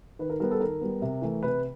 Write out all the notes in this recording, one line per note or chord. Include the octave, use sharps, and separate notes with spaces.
D#3 B4
A#4
G3 B3 A#4
A4
D#3 A#4
G3 B3
C3
E3 A3
C3 B4